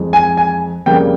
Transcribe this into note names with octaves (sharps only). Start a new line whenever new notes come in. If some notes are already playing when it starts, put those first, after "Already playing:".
Already playing: F2 E3 G#3
G#5
G#5
F2 C#3 G3 A#3 G5